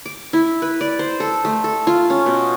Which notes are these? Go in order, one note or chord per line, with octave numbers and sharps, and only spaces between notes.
D6
E4
B4
D5
C5
A4
A3
A4
F4
C#4
B2